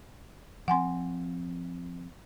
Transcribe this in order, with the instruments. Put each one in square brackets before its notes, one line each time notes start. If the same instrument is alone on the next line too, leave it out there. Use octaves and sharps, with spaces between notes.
[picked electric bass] F3 C4 [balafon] F#5 G#5 C6